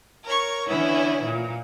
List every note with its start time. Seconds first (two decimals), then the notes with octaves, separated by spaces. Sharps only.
0.24 A#4 C#5 C#6
0.67 D3 E3 B3 C#4 E4
1.23 A#2